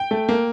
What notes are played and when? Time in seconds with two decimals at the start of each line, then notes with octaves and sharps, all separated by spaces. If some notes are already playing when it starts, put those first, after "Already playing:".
Already playing: G5
0.11 A3
0.29 A#3